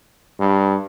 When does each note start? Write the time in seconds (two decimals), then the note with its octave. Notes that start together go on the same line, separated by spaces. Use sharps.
0.40 G2